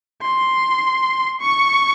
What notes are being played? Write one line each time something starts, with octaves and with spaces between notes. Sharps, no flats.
C6
C#6